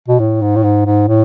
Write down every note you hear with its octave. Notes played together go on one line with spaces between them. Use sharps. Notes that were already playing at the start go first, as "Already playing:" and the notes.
B2
A2
G#2
A2
G#2
G#2
A2